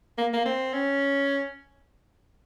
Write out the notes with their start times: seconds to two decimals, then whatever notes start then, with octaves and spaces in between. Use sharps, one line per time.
0.18 A#3
0.34 A#3
0.46 C4
0.73 C#4